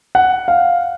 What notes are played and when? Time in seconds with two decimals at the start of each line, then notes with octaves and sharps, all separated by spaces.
0.15 F#5
0.48 F5